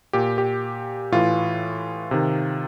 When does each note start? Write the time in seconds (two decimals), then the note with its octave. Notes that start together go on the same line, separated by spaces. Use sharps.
0.13 A#2 G4
0.38 G4
1.12 A2 E3 F4
2.11 C3 D#3